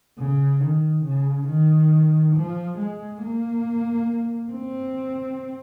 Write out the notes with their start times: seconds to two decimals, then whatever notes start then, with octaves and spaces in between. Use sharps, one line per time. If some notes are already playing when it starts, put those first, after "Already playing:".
0.18 C#3
0.60 D#3
1.04 C#3
1.47 D#3
2.35 F3
2.78 G#3
3.22 A#3
4.52 C4